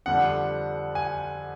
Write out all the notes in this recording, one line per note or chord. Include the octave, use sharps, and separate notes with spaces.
F2 D3 G3 F#5
G#5